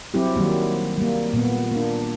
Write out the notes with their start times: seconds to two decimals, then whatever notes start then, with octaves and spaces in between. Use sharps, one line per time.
0.14 F#3 G3 C4 E4 G4
0.36 D#3 F#3 G3 A#3
0.98 G3 A#3
1.33 A#2 B3
1.71 A#3 D4